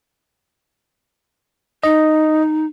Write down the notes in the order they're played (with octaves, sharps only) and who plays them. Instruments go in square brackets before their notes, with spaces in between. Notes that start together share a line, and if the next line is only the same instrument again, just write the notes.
[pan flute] D#4 [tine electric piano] D#5